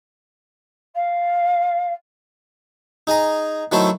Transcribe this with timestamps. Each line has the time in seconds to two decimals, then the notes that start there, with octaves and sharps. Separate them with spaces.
0.95 F5
3.07 D#4 G#4 G#5 A#5
3.72 D#3 F#3 A3 E4 A4 C5